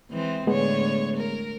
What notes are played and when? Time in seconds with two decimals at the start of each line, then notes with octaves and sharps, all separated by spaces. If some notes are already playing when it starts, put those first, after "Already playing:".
0.11 E3 G#3 C4
0.47 A2 D3 G#3 B3 C#5
1.17 A#4